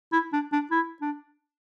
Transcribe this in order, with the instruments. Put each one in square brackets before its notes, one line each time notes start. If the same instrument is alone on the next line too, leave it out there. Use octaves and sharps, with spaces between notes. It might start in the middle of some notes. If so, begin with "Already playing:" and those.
[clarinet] E4
D4
D4
E4
D4